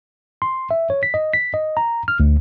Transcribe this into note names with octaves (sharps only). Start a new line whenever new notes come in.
C6
E5
C#5
B6
D#5
B6
D#5
A#5
F6
D2